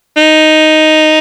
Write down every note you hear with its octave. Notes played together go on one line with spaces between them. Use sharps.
D#4